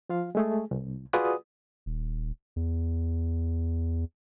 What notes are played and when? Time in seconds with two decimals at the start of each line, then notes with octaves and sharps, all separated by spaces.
0.09 F3 F4 F5
0.35 G#3 A3 G#4
0.71 C2
1.13 F4 F#4 G#4 B4 D5 D#6
1.86 D#1
2.56 E2